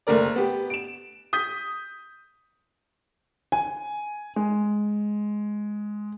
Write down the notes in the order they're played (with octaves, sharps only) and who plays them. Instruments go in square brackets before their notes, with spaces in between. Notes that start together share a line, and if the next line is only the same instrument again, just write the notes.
[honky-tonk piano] F#1 A3 A#4 D5
B3 G4
D7 E7
D#6 G6 B6
[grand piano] G#5
G#3